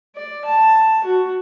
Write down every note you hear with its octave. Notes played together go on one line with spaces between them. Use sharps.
D5
A5
F#4